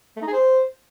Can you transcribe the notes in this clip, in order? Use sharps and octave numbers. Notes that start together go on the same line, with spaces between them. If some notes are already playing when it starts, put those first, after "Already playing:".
A3
D#4
G#4
C5